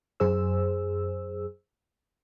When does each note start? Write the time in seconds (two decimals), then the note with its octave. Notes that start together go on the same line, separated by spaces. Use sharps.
0.20 F#2 G#4 C5 E6